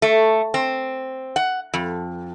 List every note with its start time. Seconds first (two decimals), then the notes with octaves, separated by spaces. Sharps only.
0.02 A3
0.54 C4
1.36 F#5
1.74 F2